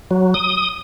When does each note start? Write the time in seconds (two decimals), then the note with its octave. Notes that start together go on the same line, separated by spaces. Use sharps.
0.11 F#3
0.34 D#6